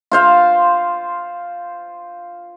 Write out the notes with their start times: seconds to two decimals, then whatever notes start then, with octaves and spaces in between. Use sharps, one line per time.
0.12 F4 C5 F5